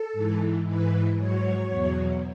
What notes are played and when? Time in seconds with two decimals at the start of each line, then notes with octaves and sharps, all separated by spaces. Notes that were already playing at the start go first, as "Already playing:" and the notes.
Already playing: A4
0.13 G#2 E3
0.65 G#2 E3 B4
1.17 G#2 F#3 C#5
1.69 E2 B2 F#3